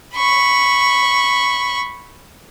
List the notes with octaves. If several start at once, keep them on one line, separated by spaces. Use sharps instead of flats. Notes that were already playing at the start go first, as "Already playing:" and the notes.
B5 C#6